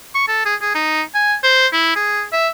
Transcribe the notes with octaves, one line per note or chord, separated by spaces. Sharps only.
C#6
A4
G#4
G#4
D#4
G#5
C5
E4
G#4
E5